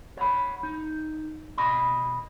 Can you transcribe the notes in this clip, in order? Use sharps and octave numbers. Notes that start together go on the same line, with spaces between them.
C#5 F#5 B5
D#4
B2 D#5 B5